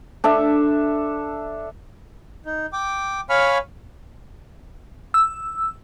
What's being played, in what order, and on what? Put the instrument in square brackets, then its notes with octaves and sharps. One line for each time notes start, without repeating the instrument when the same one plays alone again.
[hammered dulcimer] D4 A4 E5
[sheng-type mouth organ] D#4
G5 D6
C#5 F5 G#5 B5 C#6 F6
[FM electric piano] E6